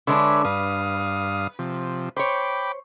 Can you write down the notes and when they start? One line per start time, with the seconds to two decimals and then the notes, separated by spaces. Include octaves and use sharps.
0.07 D3 G#3 D4 B4 C#5 E5
0.45 G2 B4 F5 D#6
1.59 C3 F3
2.17 C5 C#5 G5 B5 D6